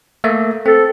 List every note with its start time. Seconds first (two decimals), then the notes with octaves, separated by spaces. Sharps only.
0.24 A3 A#3 E5
0.66 C4 A4